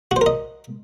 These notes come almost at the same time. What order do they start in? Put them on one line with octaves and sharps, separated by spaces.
F#4 C5 A#4 D#5